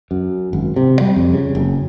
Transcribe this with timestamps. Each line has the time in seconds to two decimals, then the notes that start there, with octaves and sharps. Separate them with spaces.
0.11 F#2
0.53 G#1
0.76 C3
1.01 G3
1.16 F2
1.33 C#3
1.55 F#1